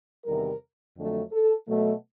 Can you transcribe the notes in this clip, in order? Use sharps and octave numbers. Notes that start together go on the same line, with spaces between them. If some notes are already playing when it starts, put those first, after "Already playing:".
E2 C3 D#3 G3 A#4
F2 D3 F#3 A3
A4
B2 F#3 A3